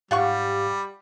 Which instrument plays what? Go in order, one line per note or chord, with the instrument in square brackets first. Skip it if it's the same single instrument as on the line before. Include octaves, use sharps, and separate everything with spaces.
[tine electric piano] G#2 G4 F5 [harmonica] G3 [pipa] F4 F#5 C#6